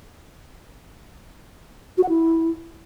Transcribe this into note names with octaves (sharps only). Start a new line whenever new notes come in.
F#4
F#5
E4